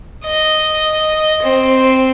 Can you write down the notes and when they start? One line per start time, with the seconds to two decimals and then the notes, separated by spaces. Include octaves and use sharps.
0.24 D#5
1.42 C4